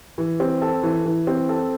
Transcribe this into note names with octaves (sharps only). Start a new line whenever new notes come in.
E3
C4
A4
E3
E3
C4
A4